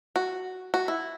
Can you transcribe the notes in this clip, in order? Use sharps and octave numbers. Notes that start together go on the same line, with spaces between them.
F#4
F#4
E4